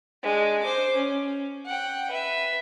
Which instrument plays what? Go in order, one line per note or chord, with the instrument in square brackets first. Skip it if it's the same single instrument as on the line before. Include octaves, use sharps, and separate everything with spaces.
[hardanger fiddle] G#3 D4
C5 D6
C#4
F#5 G5
B4 E5